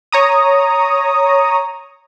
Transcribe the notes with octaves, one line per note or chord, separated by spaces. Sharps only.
C#5 A#5 D#6